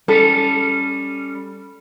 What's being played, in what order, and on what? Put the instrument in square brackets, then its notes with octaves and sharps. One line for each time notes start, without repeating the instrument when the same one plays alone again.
[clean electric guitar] G3 C#4 [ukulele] A4